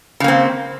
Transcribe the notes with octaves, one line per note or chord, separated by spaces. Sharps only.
C#3 A#3 C4